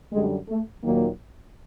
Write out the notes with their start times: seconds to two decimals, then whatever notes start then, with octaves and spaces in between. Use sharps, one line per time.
0.12 F#2 D3 G3 G#3
0.49 A3
0.84 D#2 A#2 D#3 F#3 A#3